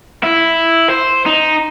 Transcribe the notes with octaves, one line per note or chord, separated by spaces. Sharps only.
E4
C5
D#4